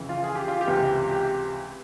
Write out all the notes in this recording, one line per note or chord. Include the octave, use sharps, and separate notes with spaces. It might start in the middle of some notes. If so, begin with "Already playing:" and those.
Already playing: F2 C#3 E3
F4
G#4
G4
F4
G4
C#2 C3 E3
G4